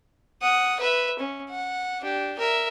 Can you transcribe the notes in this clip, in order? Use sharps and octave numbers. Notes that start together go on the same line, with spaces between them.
F#5 D#6
B4 E5
C#4
F#5
D4 G4
A#4 E5